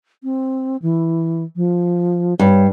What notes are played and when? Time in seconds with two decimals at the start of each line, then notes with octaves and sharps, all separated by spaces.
0.23 C4
0.82 E3
1.56 F3
2.39 G2 C#5